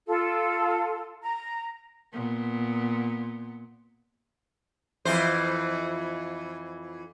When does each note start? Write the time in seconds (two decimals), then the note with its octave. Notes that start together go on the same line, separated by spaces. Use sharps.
0.07 F4 A4
1.22 A#5
2.13 A#2 B3
5.05 F2 E3 C5